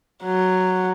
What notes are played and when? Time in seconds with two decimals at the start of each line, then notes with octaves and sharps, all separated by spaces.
0.24 F#3